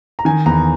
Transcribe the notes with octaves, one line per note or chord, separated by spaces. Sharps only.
A#5
D#3 G#5
E2 A#5